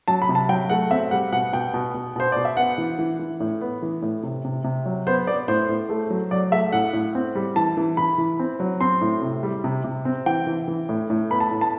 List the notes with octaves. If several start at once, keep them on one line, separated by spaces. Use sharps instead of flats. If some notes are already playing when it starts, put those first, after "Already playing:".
F#3 A5
B5
C3
A5
F#3 G5
A3 F#5
C4 E5
G3 F#5
B2 F#5
B2 G5
B2
B2
B2 C5
B2 D5
E5
B3 F#5
E3
E3
E3
A2
B3
E3
A2
C3
C3
C3
F#3
B3 C5
B3 D5
A2 C5
A2
A3
F#3
F#3 D5
A3 E5
A2 F#5
A2
C4
G3
E3 A5
E3
E3 B5
E3
C4
F#3
C4 C6
A2
C3
G3
C3
C3
C4
E3 G5
E3
E3
A2
A2
B3 B5
A5
A2
A5